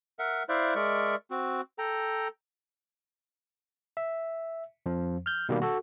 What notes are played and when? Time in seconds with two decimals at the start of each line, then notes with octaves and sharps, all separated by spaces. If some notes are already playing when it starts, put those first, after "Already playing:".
0.19 A#4 E5 F#5
0.49 E4 C5 D5 E5 F5 F#6
0.75 G#3 A#4 D5 E5 C#6
1.31 C4 F#4
1.79 A4 G5 A#5
3.97 E5
4.86 F2 F3
5.26 F6 G6
5.49 B2 D#3 G3 A#3
5.62 F#4 A4